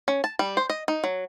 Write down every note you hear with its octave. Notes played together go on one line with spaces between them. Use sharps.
C#4
A5
G3
C5
D#5
D#4
F#3